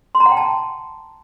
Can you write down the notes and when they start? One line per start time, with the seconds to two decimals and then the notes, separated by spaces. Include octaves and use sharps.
0.15 C6
0.20 A#5
0.26 F#5
0.31 G5
0.37 A5